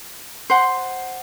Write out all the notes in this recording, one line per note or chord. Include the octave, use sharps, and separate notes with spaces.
C5 F#5 C6